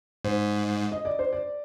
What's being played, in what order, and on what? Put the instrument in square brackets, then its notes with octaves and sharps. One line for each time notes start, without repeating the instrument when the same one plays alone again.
[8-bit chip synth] G#2 [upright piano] C5
[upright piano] D#5
D5
C5
D5